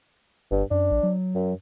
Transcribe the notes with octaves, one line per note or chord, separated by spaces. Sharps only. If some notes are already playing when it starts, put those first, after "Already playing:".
G1 G2
F#2 D4
A#1
F#3
F#2